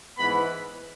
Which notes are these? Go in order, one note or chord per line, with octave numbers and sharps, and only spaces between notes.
G#2 E3 B3 E4 B4 B5